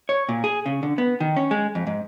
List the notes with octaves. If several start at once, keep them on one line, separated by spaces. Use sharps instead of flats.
C#5
A#2
G#4
C#3
D3
B3
D#3
C#4
G#3
F2
G#2